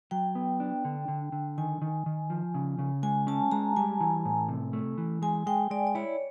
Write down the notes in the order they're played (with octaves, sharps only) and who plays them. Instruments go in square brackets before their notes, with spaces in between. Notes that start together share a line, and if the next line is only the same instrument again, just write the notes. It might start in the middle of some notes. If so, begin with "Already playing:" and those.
[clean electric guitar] F#3 [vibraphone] G5
[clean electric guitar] B3
D4
D3
D3
D3
[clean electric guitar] D#3 [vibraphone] G#5
[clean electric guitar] D#3
D#3
F3
C#3
C#3
[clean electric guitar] G#3 [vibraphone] G#5
[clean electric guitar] C#4 [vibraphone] A5
[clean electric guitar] G#3 [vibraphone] A#5
[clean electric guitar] G3 [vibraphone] G#5
[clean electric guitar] E3
A2
C3
A3
E3
[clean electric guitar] G#3 [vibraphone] G#5
[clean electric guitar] G#3 [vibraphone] G5
[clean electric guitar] G#3 [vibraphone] D5
[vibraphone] D5
[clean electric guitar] E4 [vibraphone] C#5